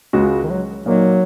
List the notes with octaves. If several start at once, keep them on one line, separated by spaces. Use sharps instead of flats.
C#2 C#3 G#3 F#4
D#3
F#3
A#2 F#3 A#3 D#4